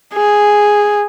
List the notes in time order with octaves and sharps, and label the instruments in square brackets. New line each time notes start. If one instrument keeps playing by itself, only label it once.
[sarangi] G#4